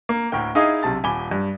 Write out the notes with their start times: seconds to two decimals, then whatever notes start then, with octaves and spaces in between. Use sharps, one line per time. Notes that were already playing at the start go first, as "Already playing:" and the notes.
0.09 A#3
0.32 D2 A2 A#4 G5
0.55 D#4 E4 G#4 D#5 F5 D#6
0.83 B1 C3 A5 A6
1.04 D#1 G#5 B5 D6 G7
1.31 G2